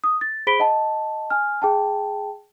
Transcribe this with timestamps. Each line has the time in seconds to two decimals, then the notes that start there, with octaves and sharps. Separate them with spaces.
0.04 D#6
0.21 A6
0.47 G#4 C5 B5 B6 D7 G7
0.60 D#5 F#5 A5
1.30 G#5 F6
1.62 G#4 G5 A5